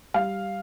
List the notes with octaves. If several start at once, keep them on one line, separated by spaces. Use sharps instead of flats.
G3 F5